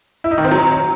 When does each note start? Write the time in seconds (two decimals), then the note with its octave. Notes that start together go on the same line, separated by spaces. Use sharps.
0.24 E4
0.31 D#4
0.38 D#3
0.45 C4
0.51 F#3